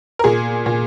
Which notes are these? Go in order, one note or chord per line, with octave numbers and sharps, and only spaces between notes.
A#4
A#2 G#4
A#2